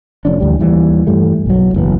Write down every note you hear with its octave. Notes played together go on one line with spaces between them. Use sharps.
F1 F2 C#4 D4
D2 E3 G3
D#2 E3 G3
G2 E3 G3 A3
B1 F#3
F#1 E2 B3